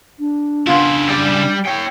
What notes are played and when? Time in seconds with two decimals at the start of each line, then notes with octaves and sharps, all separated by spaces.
0.19 D4
0.67 C#3 B3 E4 F4
1.09 G3 D5
1.66 C#5 G5